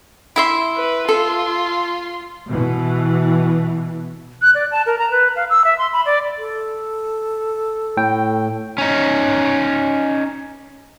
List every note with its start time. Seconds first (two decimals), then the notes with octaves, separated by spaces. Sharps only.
0.36 E4 E5 C6
0.76 B4
1.09 F4 A4 C6
2.48 B2 E3
4.42 F#6
4.55 D5
4.72 A5
4.86 A#4
4.99 A#5
5.11 B4
5.36 F5
5.50 E6
5.65 E5
5.78 C6
5.93 B5
6.06 D5
6.38 A4
7.97 A2 G5
8.78 C#4 D#4